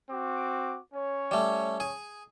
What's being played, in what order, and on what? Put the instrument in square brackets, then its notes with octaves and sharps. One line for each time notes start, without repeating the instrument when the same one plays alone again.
[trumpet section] C4 F#4 D6
C#4 C#5
[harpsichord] G3 A3
G#4